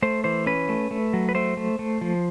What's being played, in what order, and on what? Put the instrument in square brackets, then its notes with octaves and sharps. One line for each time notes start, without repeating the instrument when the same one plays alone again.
[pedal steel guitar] A3 C5
E3 C5
C#4 B4
A3
A3
F#3
B4
A3 C5
A3
A3
F3